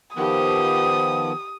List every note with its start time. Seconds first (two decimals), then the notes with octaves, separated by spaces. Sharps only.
0.16 D#3 F3 B3 G4 D#6